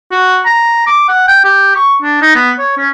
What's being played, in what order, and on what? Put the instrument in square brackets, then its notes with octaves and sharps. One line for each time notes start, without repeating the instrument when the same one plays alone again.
[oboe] F#4
A#5
D6
F#5
G5
G4
C#6
D4
D#4
B3
C#5
C#4